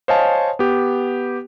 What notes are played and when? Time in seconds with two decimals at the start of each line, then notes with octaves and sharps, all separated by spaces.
0.08 C5 C#5 D#5 F5 G#5 A5
0.59 B3 G4